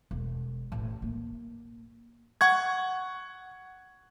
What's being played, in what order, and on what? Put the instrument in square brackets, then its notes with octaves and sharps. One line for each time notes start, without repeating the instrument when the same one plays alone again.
[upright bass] E1
A1
A#3
[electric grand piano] F#5 C#6 G#6